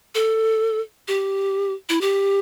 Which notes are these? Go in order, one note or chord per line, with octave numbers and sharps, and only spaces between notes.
A4
G4
E4
G4